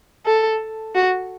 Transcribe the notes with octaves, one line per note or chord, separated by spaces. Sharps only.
A4
F#4